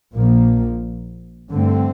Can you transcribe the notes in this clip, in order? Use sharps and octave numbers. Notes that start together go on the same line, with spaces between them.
A#1 A#2 F3 A#3
G2 D3 A3 C4